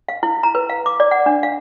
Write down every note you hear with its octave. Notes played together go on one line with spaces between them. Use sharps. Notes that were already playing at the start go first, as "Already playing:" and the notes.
F5
E4
A#5
B4
F5
D6
D5
F#5
D4
F5